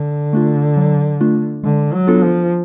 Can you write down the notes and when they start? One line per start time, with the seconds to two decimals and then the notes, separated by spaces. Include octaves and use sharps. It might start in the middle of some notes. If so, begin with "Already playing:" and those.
Already playing: D3
0.33 A3 D4 F4
0.77 F#3
1.20 A3 D4 F4
1.64 D3 G#3
1.93 F#3
2.07 B3 D4 F4 A4
2.22 F3